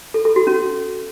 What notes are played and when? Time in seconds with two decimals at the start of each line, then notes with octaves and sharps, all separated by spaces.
0.14 A4
0.25 A4
0.36 F#4
0.47 C#4